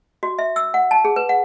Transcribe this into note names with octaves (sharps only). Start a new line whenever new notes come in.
F#4
E5
E6
F#5
A5
G#4
B4
F#5